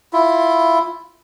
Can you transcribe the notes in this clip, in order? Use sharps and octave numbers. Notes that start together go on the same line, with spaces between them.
E4 F4